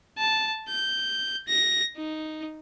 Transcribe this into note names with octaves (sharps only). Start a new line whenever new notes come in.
A5
G6
A#6
D#4